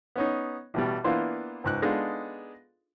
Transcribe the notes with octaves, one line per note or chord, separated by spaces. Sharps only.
B3 C#4 D#4
A1 B2 G3
E3 A#3 B3 D4 F4 C5
C#2 G#2 F#6
G#3 B3 D4 D#4 F4 A4